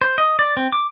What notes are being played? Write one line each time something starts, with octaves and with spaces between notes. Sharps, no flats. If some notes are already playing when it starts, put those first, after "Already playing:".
C5
D#5
D5
C4
D6